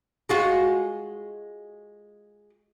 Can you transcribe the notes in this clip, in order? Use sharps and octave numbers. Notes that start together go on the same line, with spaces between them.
G#3 F4 F#4